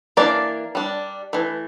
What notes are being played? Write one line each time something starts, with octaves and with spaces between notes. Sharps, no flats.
E3 A#3 D4 A#4 D5
G3 D4
E3 A3